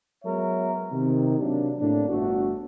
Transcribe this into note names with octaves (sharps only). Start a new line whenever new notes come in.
F#3 G#3 B3 A#4 C#5 E5
C3 D#3
C3 F#3 A#3 D4
A2 C3 A#3 D4
G1 A3 F#4